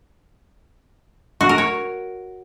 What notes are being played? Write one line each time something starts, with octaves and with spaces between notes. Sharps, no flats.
F#4
A#4
C#5